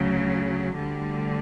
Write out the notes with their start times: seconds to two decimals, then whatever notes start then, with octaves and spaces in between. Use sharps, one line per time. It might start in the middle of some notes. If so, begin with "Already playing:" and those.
Already playing: D2 C#3 F#3
0.72 D2 D3 G3